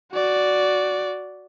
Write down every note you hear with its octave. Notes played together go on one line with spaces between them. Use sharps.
F#4 D5